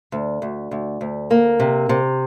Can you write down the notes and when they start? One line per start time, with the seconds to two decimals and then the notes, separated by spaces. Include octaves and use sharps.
0.12 D2
0.42 D2
0.71 D2
1.01 D2
1.31 A#3
1.60 C3
1.89 C3